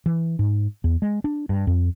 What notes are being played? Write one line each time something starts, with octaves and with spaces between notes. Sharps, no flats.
E3
G#2
E2
G#3
D4
G2
F2